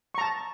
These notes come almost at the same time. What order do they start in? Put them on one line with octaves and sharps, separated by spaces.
C#6 A#5 A5